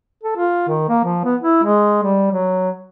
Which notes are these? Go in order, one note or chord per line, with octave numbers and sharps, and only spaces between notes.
A4
F4
D#3
A#3
F3
B3
E4
G#3
G3
F#3